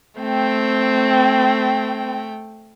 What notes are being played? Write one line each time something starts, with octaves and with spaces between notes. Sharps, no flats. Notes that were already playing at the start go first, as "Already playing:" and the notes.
A3 C4 G5